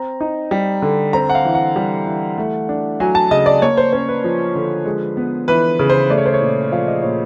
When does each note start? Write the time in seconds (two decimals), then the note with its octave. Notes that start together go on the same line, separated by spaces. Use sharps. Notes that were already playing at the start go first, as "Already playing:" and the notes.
Already playing: C4 A#5
0.21 D#4
0.51 G3
0.82 D3
1.13 C4 A#5
1.29 F#5
1.35 F5
1.45 E3
1.55 F#5
1.76 G3
2.07 E3
2.38 A3
2.69 D4
3.00 F#3 G#5
3.15 A5
3.31 C#3 D#5
3.46 D5
3.62 A#3 C#5
3.77 C5
3.93 C#4 C5
4.08 B4
4.24 F3
4.55 D3
4.85 G#3
5.17 B3
5.48 E3 B4
5.79 C#3
5.90 C5
6.09 A3 D5
6.18 C#5
6.26 C5
6.34 C#5
6.41 A#2
6.72 F3 F5
6.87 D#5
7.02 A#2 C#5